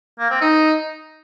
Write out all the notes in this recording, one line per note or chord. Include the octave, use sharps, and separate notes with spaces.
A#3
C4
D#4